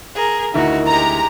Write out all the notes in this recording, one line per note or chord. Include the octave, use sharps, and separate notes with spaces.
G#4 A#4
D2 D#3 D#4 E4 F#4
G#3 G4 A#5